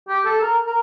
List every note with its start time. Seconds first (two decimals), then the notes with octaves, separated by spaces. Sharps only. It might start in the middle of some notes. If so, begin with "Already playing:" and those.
0.08 G4
0.25 A4
0.42 A#4
0.67 A#4